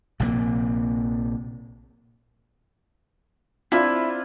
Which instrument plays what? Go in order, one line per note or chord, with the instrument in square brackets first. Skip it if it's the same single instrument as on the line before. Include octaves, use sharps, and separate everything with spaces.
[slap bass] A#1 C3 F3 A#3
[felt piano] C4 D4 F4 [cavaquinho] E4